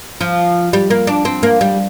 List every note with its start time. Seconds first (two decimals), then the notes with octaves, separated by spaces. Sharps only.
0.21 F3
0.73 G3
0.90 A#3
1.07 D4
1.25 C4
1.43 A#3
1.61 G3